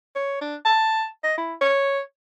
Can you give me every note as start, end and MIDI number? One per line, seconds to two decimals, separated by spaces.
0.16 0.41 73
0.41 0.56 62
0.65 1.06 81
1.24 1.34 75
1.38 1.54 64
1.61 2.00 73